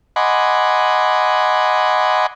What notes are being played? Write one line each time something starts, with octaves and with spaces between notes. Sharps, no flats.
D#5 F#5 G#5 B5 C6 D6